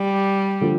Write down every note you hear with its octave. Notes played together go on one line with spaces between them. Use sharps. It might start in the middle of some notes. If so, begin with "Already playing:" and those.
Already playing: G3
D3 F3